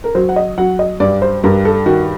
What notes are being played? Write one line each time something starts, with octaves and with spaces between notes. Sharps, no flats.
A#4
F#3 C5
F#5
D#5
F#3 F#5
D#5
G2 D5
C5
G2 A#4
A4
D#3 F#4